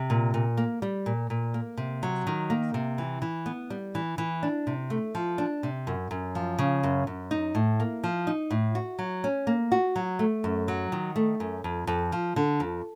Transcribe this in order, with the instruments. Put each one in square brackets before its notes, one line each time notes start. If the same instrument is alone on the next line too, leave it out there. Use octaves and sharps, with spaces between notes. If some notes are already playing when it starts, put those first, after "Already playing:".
Already playing: [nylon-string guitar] C3
A#2
A#2
A#3
G3
A#2
A#2
A#3
C3
F#3
D#3
A#3
C3
E3
E3
B3
G3
E3
E3
D4
C3
A3
F3
D4
C3
F#2
F#2
F3
C#3
F#2
F#2
D#4
A2
A#3
F3
D#4
A2
F#4
F#3
C#4
A#3
F#4
F#3
A3
F#2
F#3
D#3
A3
F#2
F2
F2
F3
D3
F2